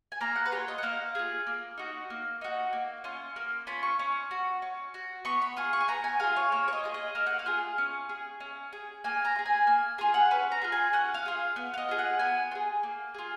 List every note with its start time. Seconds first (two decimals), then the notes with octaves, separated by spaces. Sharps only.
0.12 G#5
0.21 A#3 A#5
0.36 F#5
0.46 B4
0.52 F4 G#4 C#5
0.68 D#5
0.78 F#5
0.83 A#3 F5
1.15 F4 G#4
1.47 A#3
1.77 D#4 F#4
2.10 A#3
2.41 D#4 F#4
2.73 A#3
3.04 C#4 F4
3.36 A#3
3.67 C#4 F4 B5
3.83 C#6
3.99 C#4
4.31 F#4
4.62 C#4
4.94 F#4
5.25 B3 C#6
5.42 B5
5.57 F4 G#4 D#6
5.73 C#6
5.81 G#5
5.88 B3 A#5
6.04 G#5
6.20 F4 G#4 F5
6.36 C#5
6.52 A#3 C#5
6.68 C#5
6.73 D#5
6.83 F4 G#4
6.94 D#5
7.15 A#3 F5
7.26 F#5
7.39 F5
7.46 F4 G#4
7.78 C#4
8.09 G#4
8.40 C#4
8.73 G#4
9.04 A#3 G#5
9.25 A#5
9.36 F4
9.39 G#4
9.46 G#5
9.67 A#3 G#5
9.98 F4 G#4 G#5
10.14 F#5
10.31 C#4 B4
10.52 A#5
10.62 F4 G#4
10.72 G#5
10.93 C#4 F#5
11.14 F5
11.26 F4 G#4
11.56 B3 F5
11.74 F5
11.78 D#5
11.89 F4 G#4
11.99 F#5
12.19 B3 G#5
12.51 F4
12.55 G#4
12.83 A#3
13.14 F4 G#4